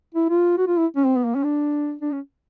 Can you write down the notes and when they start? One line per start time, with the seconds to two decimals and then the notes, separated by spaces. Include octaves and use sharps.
0.15 E4
0.30 F4
0.58 F#4
0.68 F4
0.77 E4
0.96 C#4
1.06 C4
1.16 B3
1.25 A#3
1.35 C#4
1.44 D4
2.02 D4
2.12 C#4